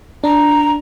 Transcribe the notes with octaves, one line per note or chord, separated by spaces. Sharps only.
D4 A#5